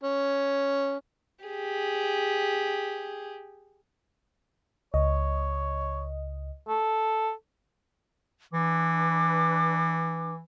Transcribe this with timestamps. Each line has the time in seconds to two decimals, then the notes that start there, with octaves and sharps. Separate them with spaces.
0.03 C#4
1.45 G4 G#4
4.94 C#2 C#5 D#5
6.68 A4
8.53 E3 D4 B4 D6